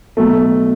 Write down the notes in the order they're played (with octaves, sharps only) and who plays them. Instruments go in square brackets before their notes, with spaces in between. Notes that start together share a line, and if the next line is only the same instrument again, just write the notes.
[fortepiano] B1 B2 A3